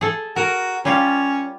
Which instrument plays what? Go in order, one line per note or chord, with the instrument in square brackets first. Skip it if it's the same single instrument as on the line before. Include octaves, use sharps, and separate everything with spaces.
[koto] G#4 A4
[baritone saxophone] F#4 [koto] A#4
[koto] G3 F4 [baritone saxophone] C#4